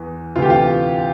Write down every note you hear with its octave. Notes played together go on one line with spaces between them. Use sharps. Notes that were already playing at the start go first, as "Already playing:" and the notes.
Already playing: E2 E3
D2 C3 E3 F4
G4
F4